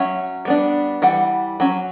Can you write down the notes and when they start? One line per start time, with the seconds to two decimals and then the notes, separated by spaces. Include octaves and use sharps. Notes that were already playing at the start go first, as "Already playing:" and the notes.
Already playing: F#3 C#4 C#5 E5
0.45 G3 B3 D4
1.02 E3 G3 F#5
1.60 F#3 C#4